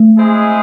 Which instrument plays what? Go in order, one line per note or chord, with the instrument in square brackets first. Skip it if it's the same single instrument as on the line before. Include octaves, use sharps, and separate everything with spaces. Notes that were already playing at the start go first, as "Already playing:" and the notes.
Already playing: [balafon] A3
[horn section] G#3 C4 E4 G#4